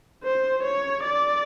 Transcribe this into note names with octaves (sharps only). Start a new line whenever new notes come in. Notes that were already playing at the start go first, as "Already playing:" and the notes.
C5
C#5
D5